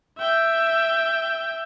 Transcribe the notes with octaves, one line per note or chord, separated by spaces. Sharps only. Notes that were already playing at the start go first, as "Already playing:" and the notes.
E5 G5